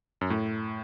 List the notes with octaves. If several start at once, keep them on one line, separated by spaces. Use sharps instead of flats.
F#2
A2